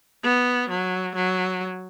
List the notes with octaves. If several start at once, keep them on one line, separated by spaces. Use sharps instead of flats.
B3
F#3
F#3